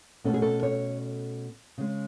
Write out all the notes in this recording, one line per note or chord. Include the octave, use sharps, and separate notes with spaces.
B2 A3 C#4 A4
G#4
A4
C#5
C#3 G#3 C#4